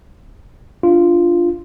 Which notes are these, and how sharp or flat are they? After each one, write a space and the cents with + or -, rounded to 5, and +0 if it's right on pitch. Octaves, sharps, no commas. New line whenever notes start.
D4 +0 F4 -10